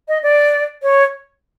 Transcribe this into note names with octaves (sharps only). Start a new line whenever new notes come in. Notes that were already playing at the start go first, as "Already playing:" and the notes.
D#5
D5
C#5